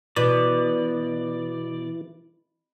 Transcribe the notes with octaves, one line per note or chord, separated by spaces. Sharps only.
B2 E3 D5